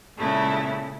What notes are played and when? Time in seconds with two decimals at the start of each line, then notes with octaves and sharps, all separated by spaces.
0.17 A#2 C#3 G#3 A3 E4